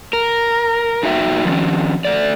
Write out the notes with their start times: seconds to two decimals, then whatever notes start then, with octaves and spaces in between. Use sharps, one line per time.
0.13 A#4
1.03 A#2 D#4 F#4 E5 G5
1.45 D#3 F3 C#4
2.05 A3 D5